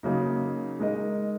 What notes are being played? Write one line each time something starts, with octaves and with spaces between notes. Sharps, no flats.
C#3 F#3 A#3 D#4
G#3 D#4 A#4 D#5